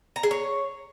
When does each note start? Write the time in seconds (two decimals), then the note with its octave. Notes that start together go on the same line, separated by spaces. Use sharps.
0.16 A#5
0.23 G#4
0.31 C#5